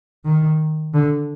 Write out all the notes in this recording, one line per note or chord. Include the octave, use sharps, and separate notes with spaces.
D#3
D3